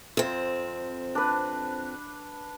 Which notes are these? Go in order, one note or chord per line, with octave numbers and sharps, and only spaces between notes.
F2 C4
D4 B4